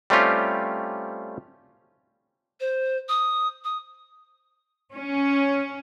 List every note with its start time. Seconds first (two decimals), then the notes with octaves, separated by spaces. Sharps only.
0.10 G3 A3 C4 C#4 F4 G4
2.60 C5
3.09 D#6
3.64 D#6
4.95 C#4